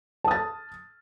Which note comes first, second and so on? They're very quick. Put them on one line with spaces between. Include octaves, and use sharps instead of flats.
A5 D#6 A6